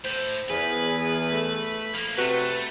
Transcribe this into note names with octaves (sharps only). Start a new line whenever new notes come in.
A2 C5
E2 G#4 B4
A3
F3 A#3
C3 A3 F#4 B4